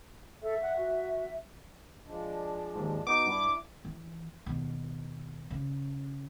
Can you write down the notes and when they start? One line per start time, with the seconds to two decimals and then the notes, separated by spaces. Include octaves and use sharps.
0.43 A4 E5
0.62 F#5
0.77 F#4
2.04 F3 G#3 D4
2.75 D#2 G#2
3.07 B3 D#4 F#4 D6
3.26 G2 D4 E4
3.85 E3
4.46 D#2 B2
5.50 C#3